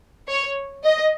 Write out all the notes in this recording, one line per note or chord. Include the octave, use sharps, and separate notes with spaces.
C#5
D#5